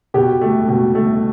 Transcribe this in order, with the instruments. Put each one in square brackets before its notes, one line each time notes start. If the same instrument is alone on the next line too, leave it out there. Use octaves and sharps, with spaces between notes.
[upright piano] B2 G4
A3
B2
A3